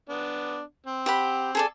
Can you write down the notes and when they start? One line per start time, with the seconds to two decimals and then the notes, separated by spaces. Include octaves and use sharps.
0.09 B3 D4
0.86 C4
1.06 G4 F#5 B5
1.55 G#4 A4 D5